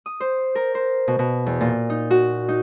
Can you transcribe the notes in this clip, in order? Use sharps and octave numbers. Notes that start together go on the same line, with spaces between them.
D#6
C5
A#4
C5
B2
B2
E2
A#2
D#4
F#4
D#4